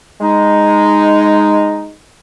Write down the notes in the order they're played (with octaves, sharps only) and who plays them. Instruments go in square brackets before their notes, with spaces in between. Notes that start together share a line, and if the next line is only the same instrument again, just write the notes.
[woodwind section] G#3 D#4